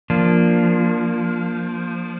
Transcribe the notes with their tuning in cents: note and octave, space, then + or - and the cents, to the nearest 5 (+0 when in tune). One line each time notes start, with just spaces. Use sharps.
F3 +0 A#3 +0 D4 +0